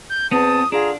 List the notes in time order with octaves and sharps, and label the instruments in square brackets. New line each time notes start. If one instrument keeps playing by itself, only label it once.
[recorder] G6
[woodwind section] E2 A5 [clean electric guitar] B3 C4 [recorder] D#6
[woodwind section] D3 F4 G#4 [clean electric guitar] D4 [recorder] A#5